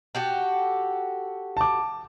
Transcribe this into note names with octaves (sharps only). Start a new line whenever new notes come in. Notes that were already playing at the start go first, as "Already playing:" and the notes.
F#4 G4 A4
A5 D6